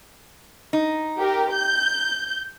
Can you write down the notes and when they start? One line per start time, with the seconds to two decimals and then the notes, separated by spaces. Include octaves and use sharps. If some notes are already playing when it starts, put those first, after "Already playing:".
0.73 D#4
1.18 G4 A#4
1.52 G6